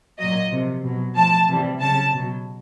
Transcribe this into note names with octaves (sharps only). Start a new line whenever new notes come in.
A#2 F#3 D#5
C3 F3
B2 F#3
A2 F3 A5
C3 E3 G3
C#3 F#3 A5
B2 F#3